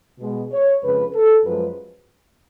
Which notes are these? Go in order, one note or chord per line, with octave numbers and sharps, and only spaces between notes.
B2 G#3
C#5
F2 C#3 G#3 B4
A4
F#2 F3 G#3 B4